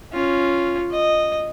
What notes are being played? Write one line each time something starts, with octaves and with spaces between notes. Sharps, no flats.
C#4 F4
D#5